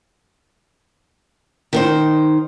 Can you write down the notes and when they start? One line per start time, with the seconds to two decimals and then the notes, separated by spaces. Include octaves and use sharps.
1.73 D#3 D#4 C5